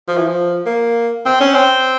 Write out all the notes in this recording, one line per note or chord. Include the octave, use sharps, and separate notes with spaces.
F3
E3
F3
A#3
C4
C#4
C4